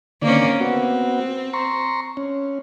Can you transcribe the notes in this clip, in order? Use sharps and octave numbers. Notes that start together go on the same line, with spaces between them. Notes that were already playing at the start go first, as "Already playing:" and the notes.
D3 D#3 A#3 C4 C#4 D5
B3 C4 F#4
A#5 C6 C#6
C#4